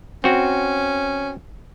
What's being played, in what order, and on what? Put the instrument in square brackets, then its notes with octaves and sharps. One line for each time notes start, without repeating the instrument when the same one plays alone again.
[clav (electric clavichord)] C4 F#4 [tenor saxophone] C#4